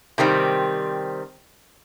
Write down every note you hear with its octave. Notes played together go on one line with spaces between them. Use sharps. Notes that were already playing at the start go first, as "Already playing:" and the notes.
C3 D#3 G3 C4